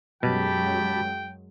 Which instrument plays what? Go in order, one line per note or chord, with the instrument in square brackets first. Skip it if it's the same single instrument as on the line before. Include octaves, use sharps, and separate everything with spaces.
[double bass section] F#2 F#3 G#3 [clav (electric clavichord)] B2 [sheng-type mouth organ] G4 A5 B5 [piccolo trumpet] G5